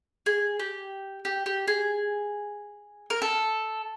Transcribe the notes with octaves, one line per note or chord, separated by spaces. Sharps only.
G#4
G4
G4
G4
G#4
A#4
A4